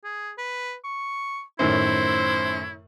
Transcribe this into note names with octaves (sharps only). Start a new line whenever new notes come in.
G#4
B4
C#6
F#2 A2 D#3 E4 C5